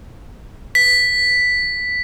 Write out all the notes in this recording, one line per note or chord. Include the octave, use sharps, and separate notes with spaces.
B6